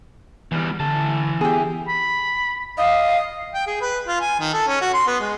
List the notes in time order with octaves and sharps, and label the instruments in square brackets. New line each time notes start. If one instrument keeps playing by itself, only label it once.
[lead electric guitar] E2 G3 [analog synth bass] E3
[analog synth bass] D3 [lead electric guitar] E3 A5
[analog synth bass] B3 [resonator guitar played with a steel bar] G4 G#4
[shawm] B5
[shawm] D#5 [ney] F5
[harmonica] G5
G#4
B4
F4
G#5
D#3
A4
C#4
F#4
C6
B3
G#3